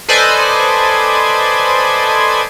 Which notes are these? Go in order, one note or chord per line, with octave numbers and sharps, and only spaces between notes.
A4 B4 C5 D5 D#5 G#5